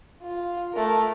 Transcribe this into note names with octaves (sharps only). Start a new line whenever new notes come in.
F4
A3 A#4